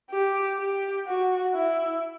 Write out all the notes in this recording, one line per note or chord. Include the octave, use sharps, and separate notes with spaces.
G4
G4
F#4
E4